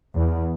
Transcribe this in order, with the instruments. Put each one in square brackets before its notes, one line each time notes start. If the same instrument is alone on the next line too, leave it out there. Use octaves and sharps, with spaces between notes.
[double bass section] E2